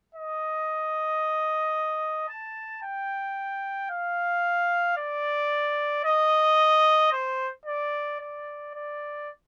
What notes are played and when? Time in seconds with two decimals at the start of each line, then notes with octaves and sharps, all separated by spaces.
0.15 D#5
2.29 A5
2.83 G5
3.90 F5
4.97 D5
6.05 D#5
7.13 C5
7.66 D5
8.20 D5
8.74 D5